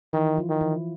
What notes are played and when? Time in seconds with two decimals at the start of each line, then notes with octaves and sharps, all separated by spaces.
0.13 D#3 E3 E4
0.37 F3 F4
0.49 D#3
0.61 E3 E4